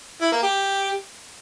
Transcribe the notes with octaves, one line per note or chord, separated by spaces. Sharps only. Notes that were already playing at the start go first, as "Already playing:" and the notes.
E4
A#3
G4